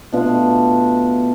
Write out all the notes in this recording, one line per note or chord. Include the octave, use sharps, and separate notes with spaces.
B2 A3 D4 F4